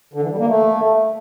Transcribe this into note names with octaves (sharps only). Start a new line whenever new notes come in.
D3
E3
G3
A#3
A3